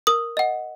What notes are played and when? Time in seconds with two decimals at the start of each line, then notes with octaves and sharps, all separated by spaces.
0.07 A#4 D#6
0.37 D#5 F#5